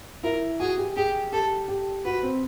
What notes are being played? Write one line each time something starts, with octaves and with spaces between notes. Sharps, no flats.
E4 A#4
F#4 G#4
G4
G4 G#4
G4 A4
G4
F#4 B4
C4